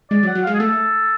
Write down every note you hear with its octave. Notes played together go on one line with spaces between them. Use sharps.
G#3 D5
F#3
F#5
F#3
G#3 F5
G#4
A3 A4